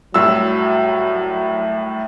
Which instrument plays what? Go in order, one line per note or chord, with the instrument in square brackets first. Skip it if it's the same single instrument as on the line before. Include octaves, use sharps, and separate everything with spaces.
[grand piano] C2 A2 E6 [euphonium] F#3